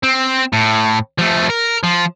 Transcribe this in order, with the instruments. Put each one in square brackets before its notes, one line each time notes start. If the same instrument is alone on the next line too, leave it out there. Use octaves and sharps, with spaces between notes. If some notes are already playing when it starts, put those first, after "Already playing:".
[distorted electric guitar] C4
A2
F3 A3
A#4
F3